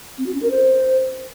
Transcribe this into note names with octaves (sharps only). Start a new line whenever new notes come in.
C4
F#4
C#4
A#4
C5